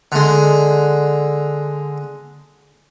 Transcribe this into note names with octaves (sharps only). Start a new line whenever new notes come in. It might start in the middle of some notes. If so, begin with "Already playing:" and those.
D3 G#3